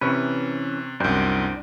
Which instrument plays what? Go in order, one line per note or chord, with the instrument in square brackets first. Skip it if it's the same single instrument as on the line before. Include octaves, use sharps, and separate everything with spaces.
[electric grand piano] C3 [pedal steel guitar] E3 C#4 B4
[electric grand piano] C2 F#2 [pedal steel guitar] D4 C5 G5